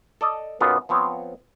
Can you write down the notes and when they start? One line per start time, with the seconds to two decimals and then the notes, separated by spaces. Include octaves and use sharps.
0.21 A4 D5 D#5
0.60 B1 F#2 A#3 B3 F4
0.89 F3 B3 C4 C#5